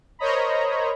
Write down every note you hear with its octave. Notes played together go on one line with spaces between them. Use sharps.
A#4 C5 C#5 D#5 A#5 B5